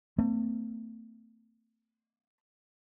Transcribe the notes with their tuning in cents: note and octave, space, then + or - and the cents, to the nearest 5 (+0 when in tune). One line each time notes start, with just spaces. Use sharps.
A3 +35 C4 -35